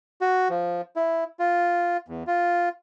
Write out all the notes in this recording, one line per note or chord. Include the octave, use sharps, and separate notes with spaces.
F#4
F3
E4
F4
E2
F4